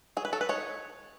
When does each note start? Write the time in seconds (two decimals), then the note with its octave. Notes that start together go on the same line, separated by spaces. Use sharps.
0.17 F#3 G#4
0.25 B4
0.33 F#3 A4
0.41 B4
0.49 D#4 C#5